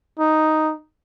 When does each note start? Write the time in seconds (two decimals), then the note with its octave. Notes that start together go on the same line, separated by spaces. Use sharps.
0.19 D#4